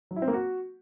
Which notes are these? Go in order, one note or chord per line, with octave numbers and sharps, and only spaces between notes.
F#3
E4
C4
A#3
F#4